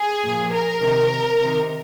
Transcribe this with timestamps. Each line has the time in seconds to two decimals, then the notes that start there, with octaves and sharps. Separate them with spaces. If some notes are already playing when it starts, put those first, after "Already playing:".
Already playing: G#4
0.24 A#2 F3
0.52 A#4
0.81 C3 D#3
1.40 C3 D#3